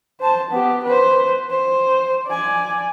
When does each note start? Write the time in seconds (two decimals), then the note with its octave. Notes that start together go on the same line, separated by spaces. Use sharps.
0.20 C5 A5
0.50 B3 G4
0.84 B4 C5
1.50 C5
2.27 D5 G#5